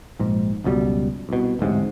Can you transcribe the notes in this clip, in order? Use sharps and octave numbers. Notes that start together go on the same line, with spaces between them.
A#1 G#2
C#2 F#2 B2 G3
C2 B2
D1 A1 G#2 C3